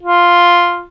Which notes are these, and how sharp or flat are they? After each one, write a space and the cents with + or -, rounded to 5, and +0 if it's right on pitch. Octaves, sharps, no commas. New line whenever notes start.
F4 +0